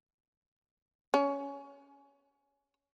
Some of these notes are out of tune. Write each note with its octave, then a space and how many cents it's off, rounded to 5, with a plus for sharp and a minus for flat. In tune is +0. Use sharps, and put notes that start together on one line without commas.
C#4 +15